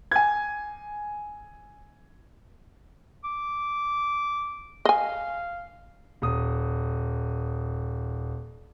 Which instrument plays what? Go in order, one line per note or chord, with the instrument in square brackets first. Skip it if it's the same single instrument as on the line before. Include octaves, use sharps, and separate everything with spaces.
[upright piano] G#5 G#6
[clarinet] D6
[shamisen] D#5 G#5 [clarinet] F5
[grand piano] D#1 D#6